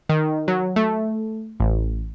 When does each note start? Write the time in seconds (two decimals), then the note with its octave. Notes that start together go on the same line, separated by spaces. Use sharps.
0.09 D#3
0.48 F#3
0.76 A3
1.60 A1